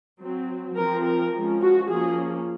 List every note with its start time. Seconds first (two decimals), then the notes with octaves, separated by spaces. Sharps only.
0.20 F#3 C4
0.76 F3 C4 A#4
1.05 A#4
1.33 F3 G#3 C#4
1.61 F#4
1.89 F3 A#3 C#4 G#4